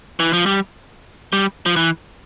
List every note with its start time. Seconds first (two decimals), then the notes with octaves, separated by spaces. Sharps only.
0.20 E3
0.33 F3
0.46 G3
1.33 G3
1.66 F3
1.76 E3